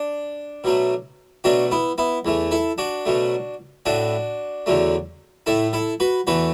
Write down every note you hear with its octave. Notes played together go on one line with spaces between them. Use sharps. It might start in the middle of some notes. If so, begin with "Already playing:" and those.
Already playing: D4
B2 F#3 A3
B2 F#3 A3 D4 F#4
B3 E4
B3 E4
E2 E3 A3
E4 A4
D4 F#4
B2 F#3 A3
A2 A3 D4 F#4
E2 D3 F#3 A3
A2 A3 E4 A4
E4 A4
F#4 B4
E2 E3 A3 F#4 B4